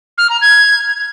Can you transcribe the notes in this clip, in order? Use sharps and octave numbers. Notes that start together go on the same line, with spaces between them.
F6
A#5
G#6